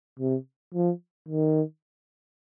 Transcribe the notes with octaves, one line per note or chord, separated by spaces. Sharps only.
C3
F3
D#3